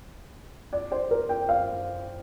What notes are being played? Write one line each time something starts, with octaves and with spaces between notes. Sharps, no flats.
D5
C5
A#4
G5
F5